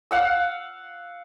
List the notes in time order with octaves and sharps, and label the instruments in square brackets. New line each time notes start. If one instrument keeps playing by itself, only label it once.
[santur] F5 F#5 E6